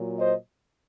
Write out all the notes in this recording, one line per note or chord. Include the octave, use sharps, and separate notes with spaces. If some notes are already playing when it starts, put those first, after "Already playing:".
Already playing: A#2 F#3
C5 D#5